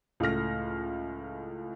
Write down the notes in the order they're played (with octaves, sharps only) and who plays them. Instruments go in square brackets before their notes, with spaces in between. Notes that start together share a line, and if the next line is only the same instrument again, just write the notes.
[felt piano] C#2 A2 A4 F6 A#6